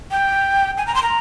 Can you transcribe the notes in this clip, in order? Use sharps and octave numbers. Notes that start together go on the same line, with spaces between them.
G5
G#5
A#5
C6
A#5